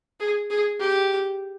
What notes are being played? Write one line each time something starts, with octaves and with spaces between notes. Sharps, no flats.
G#4
G#4
G4